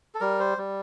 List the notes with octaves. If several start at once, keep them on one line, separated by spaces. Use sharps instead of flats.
A4
G3 A#4
C5
G3